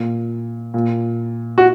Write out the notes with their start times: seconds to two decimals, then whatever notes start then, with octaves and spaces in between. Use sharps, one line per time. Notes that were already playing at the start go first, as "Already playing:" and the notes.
Already playing: A#2
0.74 A#2
1.58 F#4